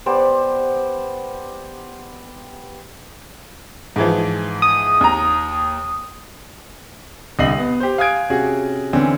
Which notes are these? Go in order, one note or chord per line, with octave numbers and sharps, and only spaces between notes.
B3 G4 C5 D5
G#2 E3 F3
D#6
D#2 A#5
C2 D3 D#5 C7 F#7
B3
G4 C5
F5 G#5 D#6 F#6 G#6 D7
C3 C#4 F#4 G#4
D3 E3 C4 C#4